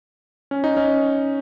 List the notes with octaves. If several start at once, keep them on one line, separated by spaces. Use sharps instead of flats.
C#4
D#4
C#4